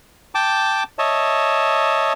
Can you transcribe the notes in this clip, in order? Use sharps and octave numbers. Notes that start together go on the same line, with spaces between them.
G5 A5 D6
C#5 D#5 E5 A5